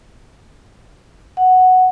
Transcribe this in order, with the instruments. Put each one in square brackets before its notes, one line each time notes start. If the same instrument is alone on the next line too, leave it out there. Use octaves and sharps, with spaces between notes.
[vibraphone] F#5